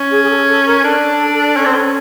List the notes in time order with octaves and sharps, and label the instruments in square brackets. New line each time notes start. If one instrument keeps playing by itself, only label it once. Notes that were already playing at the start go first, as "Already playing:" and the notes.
Already playing: [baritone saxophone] C#4
[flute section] G#4
G#4
A4
A4
A#4
[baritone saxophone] D4 [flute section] A4
[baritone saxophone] C#4
C4
C#4